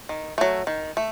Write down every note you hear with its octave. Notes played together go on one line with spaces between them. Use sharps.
D#3
F#3 A3
D#3
A3